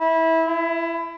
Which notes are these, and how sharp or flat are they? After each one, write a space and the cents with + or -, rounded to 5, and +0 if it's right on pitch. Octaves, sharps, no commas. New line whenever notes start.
E4 -20
E4 +25